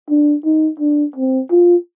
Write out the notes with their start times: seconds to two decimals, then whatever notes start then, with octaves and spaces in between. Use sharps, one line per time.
0.10 D4
0.45 D#4
0.80 D4
1.16 C4
1.51 F4